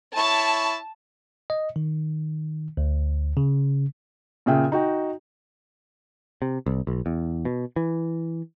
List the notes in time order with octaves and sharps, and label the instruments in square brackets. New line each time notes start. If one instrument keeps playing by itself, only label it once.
[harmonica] E4 C#5 [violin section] A5
[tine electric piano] D#5
D#3
D2
C#3
[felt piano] A#2 C#3 G#4 E5 G5
D#4 F#4 G5
[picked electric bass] C3
C2
B1
E2
B2
E3